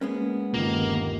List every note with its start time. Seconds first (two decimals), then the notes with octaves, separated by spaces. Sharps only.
0.01 G#3 A#3 B3 C#4
0.54 G1 D#2 A#2 D#3 F3 A#3